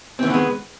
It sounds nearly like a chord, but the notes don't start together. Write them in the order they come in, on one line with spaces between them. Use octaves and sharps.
C4 E3 D#3 B3 G#3